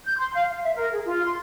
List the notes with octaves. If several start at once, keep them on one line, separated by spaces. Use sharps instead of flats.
G6
C6
F5
F5
E5
A#4
G#4
F4
C6